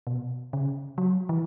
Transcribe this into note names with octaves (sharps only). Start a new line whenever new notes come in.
B2
C#3
F#3
E3